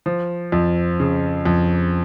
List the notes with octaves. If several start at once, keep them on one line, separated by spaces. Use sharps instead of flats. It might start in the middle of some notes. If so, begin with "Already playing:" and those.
F3
F2
C#3
F2